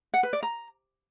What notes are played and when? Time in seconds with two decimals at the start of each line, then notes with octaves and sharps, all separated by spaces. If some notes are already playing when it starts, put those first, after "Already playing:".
0.14 F#5
0.23 B4
0.33 D5
0.43 A#5